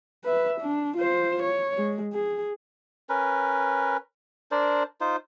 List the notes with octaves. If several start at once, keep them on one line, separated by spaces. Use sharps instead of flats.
B4 E5
D4
F4 C5
C#5
G#3
G#4
C#4 A#4 B4
D4 A#4 C5 D5
D#4 F4 C5